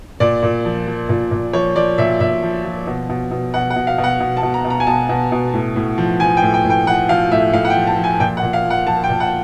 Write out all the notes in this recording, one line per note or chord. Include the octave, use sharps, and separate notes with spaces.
A#2 D5
A#2
F3
F3
A#2
A#2
F3 C#5
F3 D5
A#2 E5
A#2 E5
F3
F3
B2
B2
B2
B2 F#5
F#5
B2
F5
B2
F#5
B2
A5
B2
A#5
B2
A#5
G#5
B2 A5
B2
B2
A2
A2
F3
F3 G#5
G5
A2
G5
A2
G5
F3 F#5
F3 F5
A2 E5
A2 F5
F#5
G5
F3
A5
F3
G#5
A#2 G5
F#5
A#2
F5
F3
F#5
F3 A5
G5
A#2
F#5